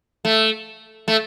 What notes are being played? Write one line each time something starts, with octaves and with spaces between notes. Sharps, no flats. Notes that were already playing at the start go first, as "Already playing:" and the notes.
A3
A3